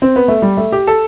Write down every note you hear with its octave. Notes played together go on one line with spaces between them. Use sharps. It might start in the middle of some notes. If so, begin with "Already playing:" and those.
C4
B3
A3
G3
A3
G4
A4